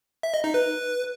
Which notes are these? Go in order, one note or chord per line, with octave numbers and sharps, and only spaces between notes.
E5
D#5
D#4
B4